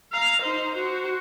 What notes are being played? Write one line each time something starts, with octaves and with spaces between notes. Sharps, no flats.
F5 A#5
D#4 C5
F#4 C5